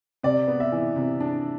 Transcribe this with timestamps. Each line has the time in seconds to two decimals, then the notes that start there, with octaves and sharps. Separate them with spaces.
0.23 C3 D5
0.48 B3
0.60 E5
0.72 E3
0.96 C3
1.20 D4